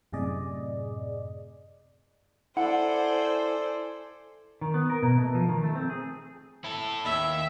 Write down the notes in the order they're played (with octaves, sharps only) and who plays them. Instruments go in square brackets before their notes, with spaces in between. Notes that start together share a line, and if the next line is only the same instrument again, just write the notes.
[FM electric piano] F#2 A2 C3 G#4 D5 D#5
[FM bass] E4 [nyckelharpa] A4 D5 [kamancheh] C5 G#5 [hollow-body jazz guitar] F#5
[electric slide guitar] D#3
B3
A#4
B2
A3
F3
D#3
A3
C4
G#4
[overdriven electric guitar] E4 A4
[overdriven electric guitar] D#2 [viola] E5